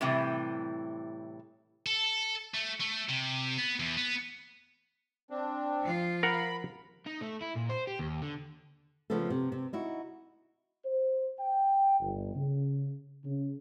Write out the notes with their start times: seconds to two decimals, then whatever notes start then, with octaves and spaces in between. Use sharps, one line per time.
0.01 A2 C3 E3 G3
1.86 A4
2.54 A3
2.81 A3
3.09 C3
3.58 B3
3.80 E2
3.97 B3
5.30 C4 D4
5.82 F3 F4
6.23 A#4 F#5 B5
7.06 D#4
7.21 A3
7.41 E4
7.55 A#2
7.69 C5
7.87 G4
7.99 D#2
8.22 D3
9.10 C#3 F3 A3 B3 A4
9.30 C3
9.52 C3
9.73 D#4 E4 F#4
10.85 C5
11.39 G5
12.00 G1
12.35 C#3
13.24 C#3